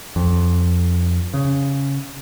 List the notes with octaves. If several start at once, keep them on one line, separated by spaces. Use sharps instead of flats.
F2
C#3